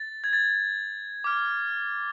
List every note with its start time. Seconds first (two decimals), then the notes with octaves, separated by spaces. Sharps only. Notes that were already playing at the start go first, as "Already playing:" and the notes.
Already playing: A6
0.24 G#6
0.33 A6
1.24 D6 F6